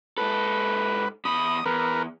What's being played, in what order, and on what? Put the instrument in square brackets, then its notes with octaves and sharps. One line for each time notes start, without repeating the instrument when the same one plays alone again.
[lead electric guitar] G#2 A4 [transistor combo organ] B4
[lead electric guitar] E2 B5 [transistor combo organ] D#6
[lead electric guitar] E2 [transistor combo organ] A#4 B4